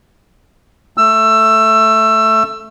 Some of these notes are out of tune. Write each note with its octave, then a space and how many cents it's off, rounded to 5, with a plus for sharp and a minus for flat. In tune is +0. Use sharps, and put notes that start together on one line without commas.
A3 +0 E6 +20